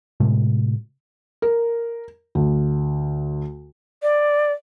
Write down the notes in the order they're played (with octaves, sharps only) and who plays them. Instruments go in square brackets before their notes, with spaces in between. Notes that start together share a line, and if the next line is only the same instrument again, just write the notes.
[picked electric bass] A2 C3 G#3
[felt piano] A#4
D2
[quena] D5